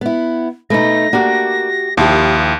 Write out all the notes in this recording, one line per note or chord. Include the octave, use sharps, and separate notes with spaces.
B3 E4
B2 A3 D#4 B4 A#6
A#3 D4 F#4 G4
D#2 F3 E4 G4 F5 D#6